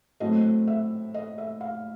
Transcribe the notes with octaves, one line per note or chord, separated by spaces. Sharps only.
A2 F#3 A3 C4 D#5
E5
D#5
E5
F5